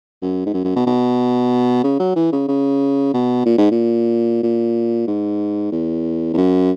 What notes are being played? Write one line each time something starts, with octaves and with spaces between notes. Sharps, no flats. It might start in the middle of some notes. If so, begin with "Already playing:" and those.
F#2
G#2
F#2
F#2
B2
B2
C#3
F#3
E3
C#3
C#3
B2
A#2
G#2
A#2
A#2
G#2
E2
E2
F#2